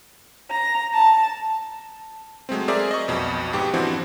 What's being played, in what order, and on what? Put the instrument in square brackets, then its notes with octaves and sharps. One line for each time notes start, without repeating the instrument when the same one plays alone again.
[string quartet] A#5
A5
[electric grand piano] F#3 G#3 A3 C4
G#4 A#4 C5 D5 E5 A#5
D#5 C#6
B1 F2 B2
G#2 B2 G4
E3 F3 C4 D4 E4 F#4